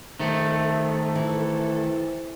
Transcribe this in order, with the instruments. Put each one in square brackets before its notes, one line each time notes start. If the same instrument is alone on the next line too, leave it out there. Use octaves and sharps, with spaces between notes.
[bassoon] C3 [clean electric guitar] D#3 A3 [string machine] A4
[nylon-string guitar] E3